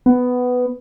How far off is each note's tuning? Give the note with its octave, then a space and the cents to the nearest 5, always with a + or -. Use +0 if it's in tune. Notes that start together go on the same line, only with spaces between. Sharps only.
B3 +10